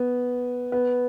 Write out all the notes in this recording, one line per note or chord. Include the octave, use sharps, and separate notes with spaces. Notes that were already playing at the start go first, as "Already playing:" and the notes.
Already playing: B3
B3